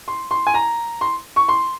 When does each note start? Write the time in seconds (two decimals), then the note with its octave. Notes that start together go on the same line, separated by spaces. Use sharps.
0.08 C6
0.31 C6
0.47 G#5
0.54 A#5
1.01 C6
1.36 C#6
1.48 C6